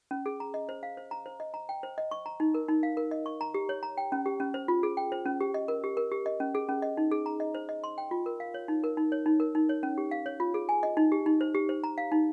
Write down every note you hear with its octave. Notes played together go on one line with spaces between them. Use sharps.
C#4
G#4
A#5
D#5
C5
F5
C5
A#5
C5
D#5
A#5
G5
C5
D#5
C#6
A#5
D#4
A#4
D#4
F5
A#4
D#5
C#6
A#5
G4
C#5
A#5
G5
C#4
G4
C#4
C5
F4
G#4
G5
C5
C#4
G4
D#5
A#4
G4
A#4
G4
D#5
C#4
G#4
C#4
D#5
D#4
G#4
A#5
D#5
C5
D#5
C6
G5
F4
A#4
F5
C#5
D#4
A#4
D#4
C#5
D#4
A#4
D#4
C#5
C#4
G4
F5
C#5
F4
G#4
G#5
D#5
D#4
G4
D#4
C5
G4
C5
A#5
F5
D#4